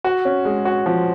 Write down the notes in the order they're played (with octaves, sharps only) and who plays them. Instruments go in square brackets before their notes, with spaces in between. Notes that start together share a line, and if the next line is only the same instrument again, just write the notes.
[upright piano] F#4
C#4
G#3
F#4
F3